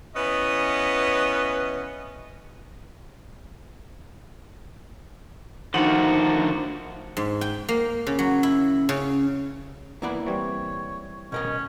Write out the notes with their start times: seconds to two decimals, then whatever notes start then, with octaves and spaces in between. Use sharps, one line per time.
0.15 E3 B3 C#4 D#5
5.74 D3 D#3 F3 A3 D4 D#4 F#4
7.17 G#2
7.41 G5
7.69 A#3
8.07 C#3
8.19 F#3
8.43 E4
8.89 C#3
10.02 E3 A#3 B3 E4 B4 D5
10.27 E3 G3 C4 C#5
11.32 B2 C#4 A#4 D#5